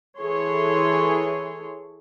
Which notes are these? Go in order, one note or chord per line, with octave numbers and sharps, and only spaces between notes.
E3 G#4 A4 C#5 C6